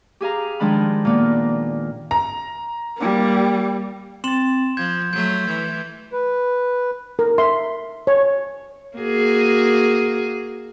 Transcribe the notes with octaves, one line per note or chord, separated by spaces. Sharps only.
G4 G#4 F5 A#5
D#3 F3 G#3 D4 B5
A#2 A#3 B3
A#5
G3 A#3
C4 C6 A6 E7 F#7
F3 G6 G#6
F#3 A3 G6
E3 G#6
B4
A#4
E5 C6
C#5
A#3 F#4 G#4